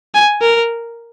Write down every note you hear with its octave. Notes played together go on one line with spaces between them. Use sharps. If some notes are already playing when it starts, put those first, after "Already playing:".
G#5
A#4